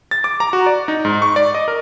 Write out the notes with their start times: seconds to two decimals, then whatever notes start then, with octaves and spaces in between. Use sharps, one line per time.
0.11 A6
0.24 D6
0.40 A#5
0.53 F#4
0.66 D5
0.88 D#4
1.05 G#2
1.22 C#6
1.36 D5
1.55 D#5
1.68 A#4